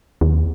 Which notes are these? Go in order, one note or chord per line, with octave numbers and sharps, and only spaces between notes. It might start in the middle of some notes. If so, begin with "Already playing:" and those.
D#2